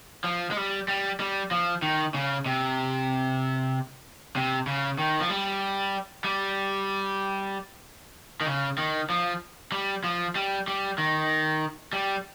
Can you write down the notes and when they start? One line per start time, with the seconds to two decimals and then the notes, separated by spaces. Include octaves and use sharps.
0.24 F3
0.51 G#3
0.57 G3
0.88 G3
1.20 G3
1.51 F3
1.82 D#3
2.14 C#3
2.46 C3
4.36 C3
4.67 C#3
4.99 D#3
5.20 F3
5.30 G3
6.24 G3
8.41 D#3
8.46 C#3
8.78 D#3
9.10 F3
9.72 G3
10.04 F3
10.35 G3
10.68 G3
10.98 D#3
11.93 G3